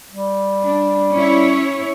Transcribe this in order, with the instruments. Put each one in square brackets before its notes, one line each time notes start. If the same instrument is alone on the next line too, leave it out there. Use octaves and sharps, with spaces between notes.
[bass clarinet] G3
[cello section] D4
C#4 E4 C#5